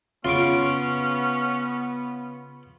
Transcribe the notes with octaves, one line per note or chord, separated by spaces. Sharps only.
C#3 B3 C#4 F4 C#6 D6